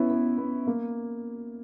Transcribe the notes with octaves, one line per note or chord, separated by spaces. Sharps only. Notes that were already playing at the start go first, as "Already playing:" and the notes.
Already playing: B3 C#4 E4
B3
B3
A#3